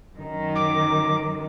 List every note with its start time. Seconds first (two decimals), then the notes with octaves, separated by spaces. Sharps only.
0.16 F#2 D#3
0.55 D6